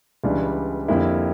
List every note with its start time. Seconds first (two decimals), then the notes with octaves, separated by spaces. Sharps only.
0.24 C#2 C#3 E3 G3 D4
0.88 F2 D3 G3 A#3 E4